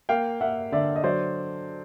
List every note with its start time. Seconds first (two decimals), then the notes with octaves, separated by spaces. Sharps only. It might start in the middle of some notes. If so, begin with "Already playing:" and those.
0.09 A#3 F5 G5
0.41 A#3 E5 F#5
0.72 D3 D5 E5
0.96 D#5
1.04 F#3 C5 D5